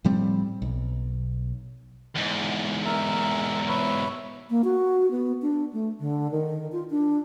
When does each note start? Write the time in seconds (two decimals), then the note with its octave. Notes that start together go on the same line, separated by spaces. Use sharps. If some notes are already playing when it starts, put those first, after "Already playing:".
0.04 A2 F3 G3 C4
0.62 B1
2.15 E2 G#2
2.85 A#4 E5
3.68 B4 C#5 E5
4.50 A#3
4.64 F#4
5.11 B3
5.42 D4
5.73 A3
6.00 D3
6.31 D#3
6.72 F4
6.90 D4